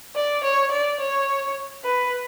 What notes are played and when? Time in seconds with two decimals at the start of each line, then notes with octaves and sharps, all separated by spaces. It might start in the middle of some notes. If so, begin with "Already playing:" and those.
0.15 D5
0.43 C#5
0.71 D5
1.00 C#5
1.84 B4